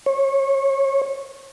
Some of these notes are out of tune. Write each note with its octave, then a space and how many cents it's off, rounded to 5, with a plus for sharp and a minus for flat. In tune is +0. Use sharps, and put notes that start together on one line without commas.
C#5 -25